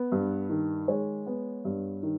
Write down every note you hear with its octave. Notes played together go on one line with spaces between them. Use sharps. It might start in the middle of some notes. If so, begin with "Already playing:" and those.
Already playing: B3
G2
D#3
G#3 C#5
B3
G2
D#3